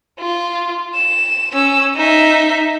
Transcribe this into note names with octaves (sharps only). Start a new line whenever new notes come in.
F4
E7
C#4 E6
D#4 E5